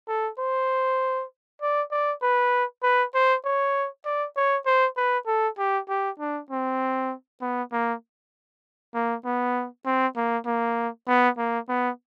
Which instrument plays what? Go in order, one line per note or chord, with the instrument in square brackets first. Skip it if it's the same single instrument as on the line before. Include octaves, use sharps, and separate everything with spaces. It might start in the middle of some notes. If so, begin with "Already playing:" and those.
[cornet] A4
C5
D5
D5
B4
B4
C5
C#5
D5
C#5
C5
B4
A4
G4
G4
D4
C4
B3
A#3
A#3
B3
C4
A#3
A#3
B3
A#3
B3